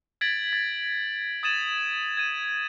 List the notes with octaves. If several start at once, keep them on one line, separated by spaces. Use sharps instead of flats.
G#6 A6 B6 D7 F#7
A6
D#6 G#6 A6 D#7 E7 F#7
G#6 D#7